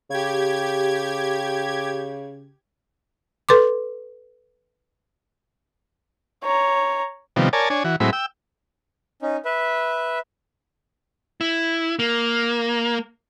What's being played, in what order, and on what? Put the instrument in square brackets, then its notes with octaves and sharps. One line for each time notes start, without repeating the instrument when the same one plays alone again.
[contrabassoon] C#3 [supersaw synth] G4 G#6
[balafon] A4 B4 C6 D6
[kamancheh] C#5 A#5
[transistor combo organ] C3 D#3 F3 G3 B3
A#4 C#5 D5 G#5 A5
D4 C#5 G#5
E3 F#4
A2 F#3 G#3 C4 E4 B5
G5 E6
[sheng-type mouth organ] C#4 D#4
B4 E5
[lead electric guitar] E4
A#3